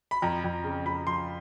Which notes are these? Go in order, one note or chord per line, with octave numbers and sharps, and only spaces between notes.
B5
F2 A#5
F2
C#3
F2 B5
F3 C6